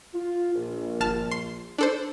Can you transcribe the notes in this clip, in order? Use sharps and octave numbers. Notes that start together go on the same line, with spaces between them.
F4
A#1
G1 A5 F6
C6
D4 A4 C5